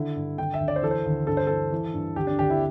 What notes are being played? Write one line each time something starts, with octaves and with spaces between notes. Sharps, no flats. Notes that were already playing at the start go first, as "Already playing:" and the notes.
Already playing: D3 E4
G2
D3 G5
E5
D2
D5
C5
E3 A4
C5
D2
G2 A4
C5
E3 A4
E3
G2
D2 G4
D4
D2 G4
E4